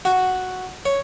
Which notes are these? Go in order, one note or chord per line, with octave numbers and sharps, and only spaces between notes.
F#4
C#5